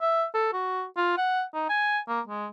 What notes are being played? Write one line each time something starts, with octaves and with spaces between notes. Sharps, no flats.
E5
A4
F#4
F4
F#5
D#4
G#5
A#3
G#3